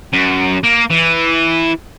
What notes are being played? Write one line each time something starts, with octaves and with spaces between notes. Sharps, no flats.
F#2
A#3
E3